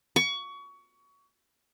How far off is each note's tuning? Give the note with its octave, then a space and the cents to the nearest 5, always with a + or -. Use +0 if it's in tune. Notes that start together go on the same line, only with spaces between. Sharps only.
C#6 +25